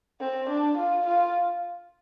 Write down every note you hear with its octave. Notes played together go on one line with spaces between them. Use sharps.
C4
D4
F4
F4